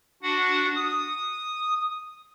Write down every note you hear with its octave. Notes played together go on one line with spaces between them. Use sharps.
D4 F#4 F#5
D#6